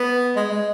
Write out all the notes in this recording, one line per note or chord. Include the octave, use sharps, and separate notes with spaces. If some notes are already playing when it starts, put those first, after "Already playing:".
Already playing: B3
G#3
G#3